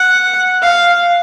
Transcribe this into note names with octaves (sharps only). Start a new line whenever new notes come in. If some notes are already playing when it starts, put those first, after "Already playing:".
Already playing: F#5
F5